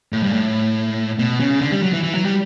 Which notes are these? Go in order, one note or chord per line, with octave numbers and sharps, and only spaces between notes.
A2
G2
A2
B2
C#3
D3
G3
F#3
E3
E3
F#3
G3